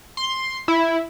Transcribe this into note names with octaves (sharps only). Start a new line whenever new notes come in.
C6
E4